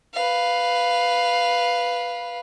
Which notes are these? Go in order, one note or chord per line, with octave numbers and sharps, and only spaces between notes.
B4 F5